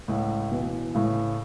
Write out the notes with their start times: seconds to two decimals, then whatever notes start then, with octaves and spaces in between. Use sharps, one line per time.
0.08 C#2 A2
0.51 B2 E3
0.94 A2 C#3